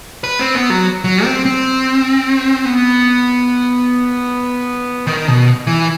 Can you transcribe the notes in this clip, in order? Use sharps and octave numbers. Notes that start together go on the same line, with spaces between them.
B4
C4
B3
F#3
F#3
C4
C4
B3
D#3
B2
E3